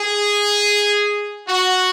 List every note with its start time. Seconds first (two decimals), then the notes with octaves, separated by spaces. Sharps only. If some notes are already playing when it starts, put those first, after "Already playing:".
Already playing: G#4
1.49 F#4